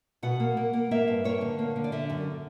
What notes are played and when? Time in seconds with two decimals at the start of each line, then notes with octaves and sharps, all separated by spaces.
0.23 B2 F#5
0.40 A#3
0.57 A#3
0.73 A#3
0.91 A#3 E5
1.08 G2
1.24 A#3 C#5
1.41 D3
1.59 A#3
1.76 D3
1.84 D5
1.92 D3 E5
2.10 F#2